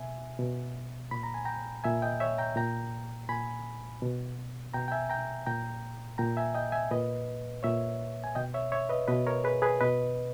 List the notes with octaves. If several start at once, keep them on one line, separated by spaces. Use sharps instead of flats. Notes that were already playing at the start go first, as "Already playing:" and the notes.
Already playing: B2 E5 G#5
B2
A#2 B5
A#5
G#5
G5 A#5
A#2 E5 G#5
D#5 G5
C#5 E5
G5 A#5
A#2 G5 A#5
A#2 G#5 B5
B2
B2 G5 A#5
G5
E5 G#5
G5 A#5
A#2 G5 A#5
A#2 G5 A#5
E5 G#5
D#5 G5
E5 G#5
A#2 B4 D#5
A#2 C#5 E5
G#5
B2 D#5 G5
C#5 E5
C#5 E5
B4 D#5
B2 B4 D#5
A#4 C#5
G#4 B4
G#4 B4
B2 B4 D#5